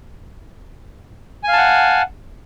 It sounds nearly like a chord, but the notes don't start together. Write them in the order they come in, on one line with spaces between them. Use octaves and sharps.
G#5 F5 A5 F#5